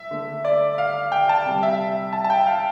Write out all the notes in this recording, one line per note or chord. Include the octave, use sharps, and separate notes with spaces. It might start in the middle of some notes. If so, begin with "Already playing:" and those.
Already playing: E5
D3 A3
D5
F5
G5
A5
C3 G3
E5
A5
A5
G5
F5